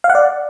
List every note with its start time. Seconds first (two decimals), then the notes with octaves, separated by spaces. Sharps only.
0.04 F5
0.10 F#5
0.15 D5